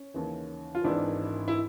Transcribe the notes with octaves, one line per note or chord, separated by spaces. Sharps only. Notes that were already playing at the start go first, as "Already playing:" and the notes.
Already playing: C#4
D#2 C#3 E3
F4
G#1 G#2 E3 D4 E4
E4